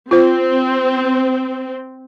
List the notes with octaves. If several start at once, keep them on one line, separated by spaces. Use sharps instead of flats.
C4 F4 C5